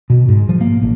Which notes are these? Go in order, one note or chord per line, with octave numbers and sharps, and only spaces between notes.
B2
G#2
F3
A#3
A1